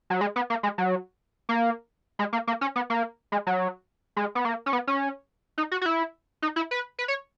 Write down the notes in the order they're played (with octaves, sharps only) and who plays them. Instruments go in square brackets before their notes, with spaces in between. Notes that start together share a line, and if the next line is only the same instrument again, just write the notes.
[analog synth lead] F#3
G#3
B3
A#3
G#3
F#3
A#3
G#3
A#3
A#3
C#4
B3
A#3
G#3
F#3
G#3
B3
A#3
C#4
B3
C#4
D#4
F#4
F#4
E4
D#4
E4
B4
B4
C#5